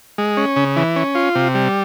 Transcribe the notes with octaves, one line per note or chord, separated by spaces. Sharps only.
G#3
C#4
C#3
E3
C#4
F4
C3
G3